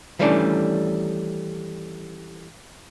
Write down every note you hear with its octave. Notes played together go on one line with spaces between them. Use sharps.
D#3 E3 G3 A3 C#4 D4